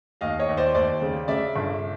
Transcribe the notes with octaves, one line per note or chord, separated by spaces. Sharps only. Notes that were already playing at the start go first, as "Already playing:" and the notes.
D#2 D#5 F5
C#5 D#5
D#2
C5 D5
D#2 C5 D5
C#3
C#3 D5 E5
G1